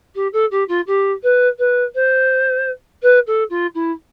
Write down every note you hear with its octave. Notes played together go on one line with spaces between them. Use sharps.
G4
A4
G4
F4
G4
B4
B4
C5
B4
A4
F4
E4